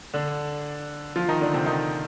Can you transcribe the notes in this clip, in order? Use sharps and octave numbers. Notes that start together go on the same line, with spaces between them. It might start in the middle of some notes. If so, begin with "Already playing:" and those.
D3 D4
F3 F4
D#3 D#4
D3 D4
C3 C4
D#3 D#4